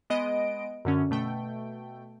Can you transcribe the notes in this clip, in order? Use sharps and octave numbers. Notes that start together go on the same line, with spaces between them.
G#3 B3 D#5 D7
F#2 D3 C#4
B2 A3 G5